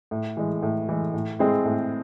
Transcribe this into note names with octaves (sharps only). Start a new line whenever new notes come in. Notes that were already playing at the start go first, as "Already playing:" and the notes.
A2
E3 G#3
A2
E3 G#3
A2
G#3 C4 E4 G#4
A2